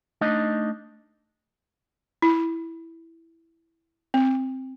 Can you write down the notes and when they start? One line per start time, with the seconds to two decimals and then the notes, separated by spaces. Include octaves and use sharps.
0.21 A3 D4 D#4 D#5
2.22 E4
4.14 C4